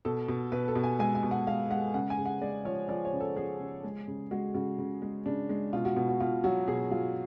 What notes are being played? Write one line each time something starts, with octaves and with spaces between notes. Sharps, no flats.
B2 A4
B2
B2 B4
A4
B2
G#5
G#3 G#5
G#5
B2
F#5
G#3 F5
G#3 F#5
C#3 F#5
G#5
C#3
F#5
G#3 D5
F3 C#5
F3 D5
C#5
C#3
A4
F3 G#4
C#3
G#3
C#3
G#3 F#4
C#3 F#4
C#3
G#3
C#3 D4
G#3
B2 F4
F#4
B2 F#4
F#4
B2 F4
F#3 F#4
B2 G#4
F#3 F4